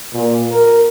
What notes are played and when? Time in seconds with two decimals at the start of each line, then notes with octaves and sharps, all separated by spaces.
0.13 A#2
0.51 A#4